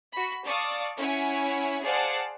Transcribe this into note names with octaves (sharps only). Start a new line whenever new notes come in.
F#4 B5
D5 F5 A5 C#6 D#6
C#4 E4 C#5 F#5 G#5
G#4 C5 D5 F5 F#5 A5